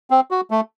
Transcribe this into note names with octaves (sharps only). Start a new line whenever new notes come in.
C4
F#4
A3